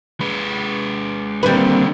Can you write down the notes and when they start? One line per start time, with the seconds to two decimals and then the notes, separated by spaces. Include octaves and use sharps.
0.20 G#3 B4
1.43 D3 D#3 G3 A#3 C4 B4